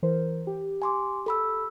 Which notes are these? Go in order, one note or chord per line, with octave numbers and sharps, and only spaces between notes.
E3 A#4 C5
G4
G#5 C6 D6
A4 B5 E6